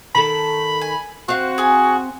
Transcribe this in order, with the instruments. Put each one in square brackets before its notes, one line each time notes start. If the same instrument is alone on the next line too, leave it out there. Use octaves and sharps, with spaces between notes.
[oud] D#3 A4 [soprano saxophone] B5
[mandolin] G#5
[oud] C4 F5 [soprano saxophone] F#4 [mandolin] F#6
[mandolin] G#4 G#5